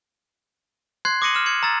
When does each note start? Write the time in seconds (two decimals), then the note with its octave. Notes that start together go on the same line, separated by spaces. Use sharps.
1.05 C6 F#6 G#6 C7
1.22 D6 D#6 A#6 C#7 D#7 F#7
1.35 F6 E7
1.46 G#6 C#7 F#7
1.63 A#5 E6 A6